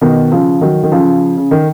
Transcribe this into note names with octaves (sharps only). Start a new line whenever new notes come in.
B2 D#3
C#3 F3
D#3 F#3
D#3
C#3 F3
C#3
D#3